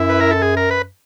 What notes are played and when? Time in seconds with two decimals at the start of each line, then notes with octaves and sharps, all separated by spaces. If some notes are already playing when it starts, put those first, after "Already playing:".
Already playing: F#2 E4
0.09 B4
0.20 A#4
0.31 A4
0.42 G#4
0.57 A#4
0.71 B4